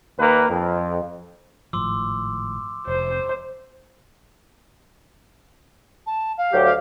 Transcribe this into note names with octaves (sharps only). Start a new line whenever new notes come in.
D#2 A#3 B4
F2
G#1 A2 F3 C6 D6 E6
F1 C5
A5
F5
D2 F#3 G4
F5